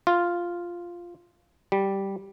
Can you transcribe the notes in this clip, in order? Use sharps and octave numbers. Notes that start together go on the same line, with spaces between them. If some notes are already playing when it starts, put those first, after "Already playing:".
F4
G3